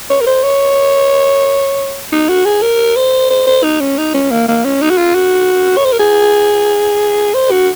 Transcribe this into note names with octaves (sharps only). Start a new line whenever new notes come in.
C#5
A#4
C5
C#5
D#4
F#4
G#4
A#4
C5
C5
C5
D#4
C#4
D#4
C#4
A#3
A#3
C#4
D#4
F#4
F4
F#4
C#5
C5
A#4
G#4
C5
F#4